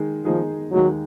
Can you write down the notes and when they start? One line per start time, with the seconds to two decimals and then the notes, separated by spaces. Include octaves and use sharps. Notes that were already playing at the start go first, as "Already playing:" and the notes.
Already playing: D#3 G#3 D#4 G#4
0.25 D#3 F3 G#3 D#4 G#4
0.72 D#2 D#3 F#3 G#3 D#4